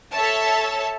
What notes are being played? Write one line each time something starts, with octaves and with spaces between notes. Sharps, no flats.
A4 C#5 E5 A5